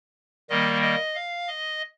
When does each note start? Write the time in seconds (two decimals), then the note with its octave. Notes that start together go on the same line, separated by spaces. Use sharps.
0.50 D#3 G3 A#3 D#5
0.82 D#5
1.15 F5
1.48 D#5